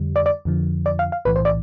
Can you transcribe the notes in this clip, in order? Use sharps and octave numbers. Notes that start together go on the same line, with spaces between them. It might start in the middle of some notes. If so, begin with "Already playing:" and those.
Already playing: F2 D3 G3
D5
D5
F2 D3 F3
D5
F5
F5
B1 A2 E3 B4
C5
D5